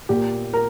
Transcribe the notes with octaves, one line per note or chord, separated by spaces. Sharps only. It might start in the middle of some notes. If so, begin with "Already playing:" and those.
A#2 A#3 G4
A#4